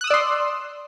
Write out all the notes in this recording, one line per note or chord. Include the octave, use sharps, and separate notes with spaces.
D5 C6 D#6 E6 F#6